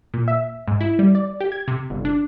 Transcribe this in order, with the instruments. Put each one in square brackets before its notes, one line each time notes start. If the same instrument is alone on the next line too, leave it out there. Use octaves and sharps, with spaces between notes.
[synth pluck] A#2
E5
G#2
E4
G3
D5
G4
G#6
C3
G1
D4